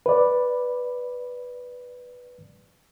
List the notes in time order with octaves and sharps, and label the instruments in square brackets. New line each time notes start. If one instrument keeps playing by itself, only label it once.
[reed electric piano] B4 D5